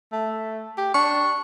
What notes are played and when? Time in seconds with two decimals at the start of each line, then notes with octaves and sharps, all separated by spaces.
0.12 A3
0.77 G4
0.94 D4 C#6